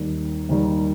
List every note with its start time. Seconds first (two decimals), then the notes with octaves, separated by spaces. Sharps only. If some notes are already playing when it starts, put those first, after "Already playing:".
Already playing: D#2 D#3 G3
0.49 D#2 D#3 G3